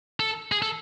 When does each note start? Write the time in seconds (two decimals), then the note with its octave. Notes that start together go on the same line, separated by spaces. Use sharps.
0.20 A4
0.52 G#4
0.62 A4